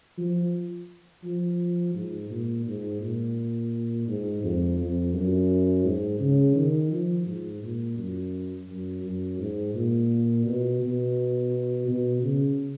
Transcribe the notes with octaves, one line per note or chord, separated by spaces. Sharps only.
F3
F3
G#2
A#2
G#2
A#2
G#2
F2
F2
F#2
G#2
C#3
D#3
F3
G#2
A#2
F#2
F#2
F#2
G#2
A#2
B2
B2
B2
C#3